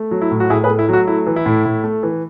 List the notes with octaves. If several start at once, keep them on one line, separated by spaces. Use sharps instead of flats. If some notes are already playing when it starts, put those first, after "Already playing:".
Already playing: A3
F#3
E4
A2
F#4
A2 E4 G#4
G#4 B4
A3
E4
F#3 F#4
A3 E4
E3
E4
A2
A2
A3
E3